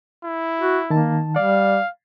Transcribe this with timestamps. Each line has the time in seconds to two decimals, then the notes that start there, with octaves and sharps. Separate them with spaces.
0.25 E4
0.59 F#4
0.90 D#3 A#3 A5
1.36 G3 D5 F5